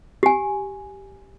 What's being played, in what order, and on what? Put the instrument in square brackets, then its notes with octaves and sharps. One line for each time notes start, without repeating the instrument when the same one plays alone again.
[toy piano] G4 G#5